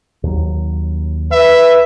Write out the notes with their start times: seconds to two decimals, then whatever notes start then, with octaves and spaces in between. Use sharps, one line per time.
0.23 D#2 F#3
1.32 B4 E5